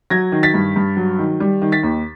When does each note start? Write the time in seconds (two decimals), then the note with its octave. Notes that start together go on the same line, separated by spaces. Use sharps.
0.10 F#3 G#6 A#6
0.32 D#3
0.43 A6 B6
0.54 G2
0.76 G2
0.97 F#3
1.19 D#3
1.40 G3
1.62 D#3
1.72 A6 B6
1.83 D#2